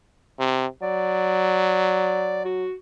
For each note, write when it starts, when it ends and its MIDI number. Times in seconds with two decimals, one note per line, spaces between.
0.39 0.67 48
0.82 2.66 54
0.82 2.41 74
2.45 2.72 66